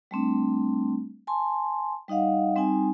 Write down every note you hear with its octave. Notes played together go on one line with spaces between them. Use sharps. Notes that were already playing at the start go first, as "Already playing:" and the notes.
G3 A3 C4 D4
G#5 A5 C6
G3 D#4 D#5 F5 F#5
G3 C4 D#4 G#5